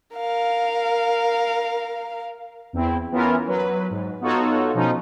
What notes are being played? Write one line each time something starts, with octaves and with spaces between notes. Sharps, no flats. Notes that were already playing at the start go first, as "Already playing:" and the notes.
A#4 F5
E2 C4 E4
E3 B3 C#4 E4 F4 A#4
F#3 B4
G#2
B3 D#4 F4 F#4 A4 C#5
B2 F3 C#4 D#4 F4